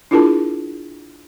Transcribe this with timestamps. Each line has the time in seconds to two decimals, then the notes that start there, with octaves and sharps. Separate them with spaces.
0.11 D4 E4 F4 G#4 A#4 A5